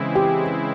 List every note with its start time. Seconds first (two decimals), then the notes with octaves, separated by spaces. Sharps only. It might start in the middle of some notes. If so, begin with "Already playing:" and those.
Already playing: C#3 E3 G#3 C4 E4
0.15 G4